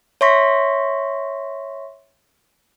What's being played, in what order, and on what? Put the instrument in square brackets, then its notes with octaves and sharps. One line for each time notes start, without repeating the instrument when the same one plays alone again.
[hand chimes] C#5 E5 C6 C#6 A#6 B6